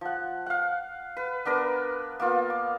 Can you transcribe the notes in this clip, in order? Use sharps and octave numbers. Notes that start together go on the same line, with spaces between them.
F3 F#5
F5 F#5
B4
B3 D4 A#4 B4
A#3 B3 F4
D6